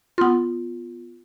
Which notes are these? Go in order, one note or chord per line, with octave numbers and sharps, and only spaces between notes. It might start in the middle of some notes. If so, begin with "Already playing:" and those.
B3 F4